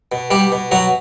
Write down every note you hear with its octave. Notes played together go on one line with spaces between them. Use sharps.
B2
B2 G3 G4
B2
B2 F#3 F#4